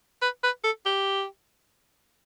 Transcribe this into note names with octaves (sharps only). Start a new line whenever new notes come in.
B4
B4
A4
G4